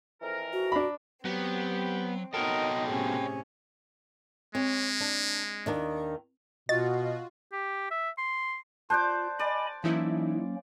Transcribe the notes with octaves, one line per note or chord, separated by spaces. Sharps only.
F2 E3 A#4
F#4
D4 B5
F#3 B3 C4 G4
B3 D#4 F#4 A4 A#4 C#5 D#5 G5
A2 C3 C#4 G#4
G#3 C4 C#5
D4
D#2 D#3 D4
B2 F4 F#4 D#5 A6
G4
E5
C6
F4 C5 D5 A5 D6 F#6 G6
D5 D#5 G#5 B5
E3 F#3 A#3 C#4 D#4 E4